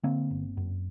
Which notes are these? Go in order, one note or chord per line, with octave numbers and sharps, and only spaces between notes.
D3 A#3 C4
G1
F#2